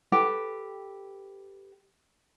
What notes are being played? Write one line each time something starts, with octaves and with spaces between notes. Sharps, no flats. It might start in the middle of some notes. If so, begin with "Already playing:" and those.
G4 A4 B4 G5